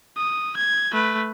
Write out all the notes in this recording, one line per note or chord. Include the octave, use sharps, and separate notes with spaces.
D#6
G#6
A3 B4